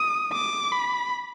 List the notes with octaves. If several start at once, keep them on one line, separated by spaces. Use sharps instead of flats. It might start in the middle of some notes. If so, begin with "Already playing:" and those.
Already playing: D#6
D6
B5